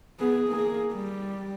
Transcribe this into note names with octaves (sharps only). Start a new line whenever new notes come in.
B3 G#4
A#3 G#4
G3